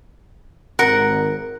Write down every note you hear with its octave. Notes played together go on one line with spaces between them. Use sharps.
G#1 A#4 F#5